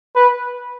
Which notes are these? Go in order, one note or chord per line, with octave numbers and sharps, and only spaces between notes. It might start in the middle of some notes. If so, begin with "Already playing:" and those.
B4